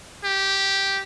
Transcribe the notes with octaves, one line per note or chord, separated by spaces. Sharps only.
G4